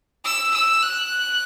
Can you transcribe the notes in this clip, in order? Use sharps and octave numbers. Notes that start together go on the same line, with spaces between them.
E6
E6
F#6